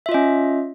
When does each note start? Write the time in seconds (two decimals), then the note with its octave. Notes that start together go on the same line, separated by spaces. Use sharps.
0.06 E5
0.09 F4
0.12 D#5
0.14 C#4